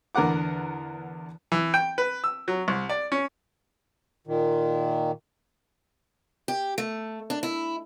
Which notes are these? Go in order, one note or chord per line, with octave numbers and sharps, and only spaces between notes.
E2 D3 A#4 B4 F#5 D6
E3
G5
B4
E6
F#3
C2
D5
C#4
A#2 D#3
G4
A3
D4
E4